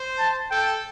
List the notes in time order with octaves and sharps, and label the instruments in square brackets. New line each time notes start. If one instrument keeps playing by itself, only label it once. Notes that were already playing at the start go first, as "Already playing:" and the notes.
Already playing: [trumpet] C5
[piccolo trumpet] A5
[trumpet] A4 [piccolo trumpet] G5